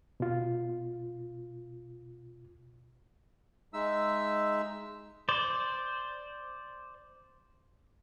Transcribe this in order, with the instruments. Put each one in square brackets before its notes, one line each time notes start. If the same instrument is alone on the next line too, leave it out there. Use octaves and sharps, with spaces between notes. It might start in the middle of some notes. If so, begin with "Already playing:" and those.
[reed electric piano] B2 F4
[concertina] G#3 D#4 E5 E6
[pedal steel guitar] C5 D5